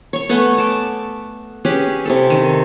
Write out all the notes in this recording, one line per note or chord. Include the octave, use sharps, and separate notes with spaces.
C#5 C#6
A3 B3 F#5 G#5
A5 D6
C#4 G4 G#4 B4
C3 E4 A4
D#3